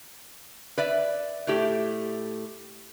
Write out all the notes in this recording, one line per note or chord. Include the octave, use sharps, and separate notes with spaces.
B4 D5 E5
A2 A3 G4